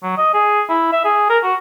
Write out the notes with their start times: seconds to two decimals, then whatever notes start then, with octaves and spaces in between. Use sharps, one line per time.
0.03 F#3
0.17 D#5
0.34 G#4
0.69 E4
0.93 E5
1.05 G#4
1.30 A#4
1.43 F#4